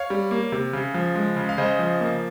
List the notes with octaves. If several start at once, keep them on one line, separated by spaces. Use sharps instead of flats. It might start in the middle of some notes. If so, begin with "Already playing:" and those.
Already playing: C#5 F5
G3
A#3
C3
C#3
F3
G#3
C#3
F5
C#3 C5 D#5
F3
A#3